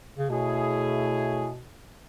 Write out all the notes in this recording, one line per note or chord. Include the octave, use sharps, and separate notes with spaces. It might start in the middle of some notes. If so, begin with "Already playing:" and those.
C#3
B2 A3 E4 G#4 C#5